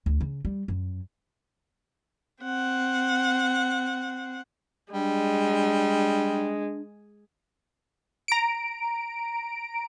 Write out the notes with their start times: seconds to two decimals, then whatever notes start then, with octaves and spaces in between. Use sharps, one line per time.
0.06 D2
0.21 C#3
0.45 G3
0.68 F#2
2.43 C4 F#5
4.93 G3 G#3 D4
8.28 A#5 D7